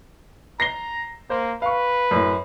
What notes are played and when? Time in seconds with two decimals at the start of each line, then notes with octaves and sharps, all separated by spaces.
0.60 A#5 A#6 C7 G7
1.30 A#3 C5
1.62 B4 F5 C#6
2.11 F#2 A2